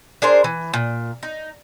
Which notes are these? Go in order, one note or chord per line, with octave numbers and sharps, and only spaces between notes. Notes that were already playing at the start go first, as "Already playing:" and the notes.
D4 G#4 A#4 C5
E3
A#2
D#4